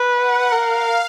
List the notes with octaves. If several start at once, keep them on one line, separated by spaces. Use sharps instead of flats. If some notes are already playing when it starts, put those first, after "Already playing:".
Already playing: B4
F#5
A#4 F5